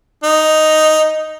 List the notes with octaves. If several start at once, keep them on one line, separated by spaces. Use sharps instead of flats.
D#4